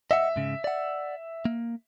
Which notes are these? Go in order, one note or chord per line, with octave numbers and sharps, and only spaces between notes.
D#5 E5 F#5
G#2 C#3
D5 F#5
A#3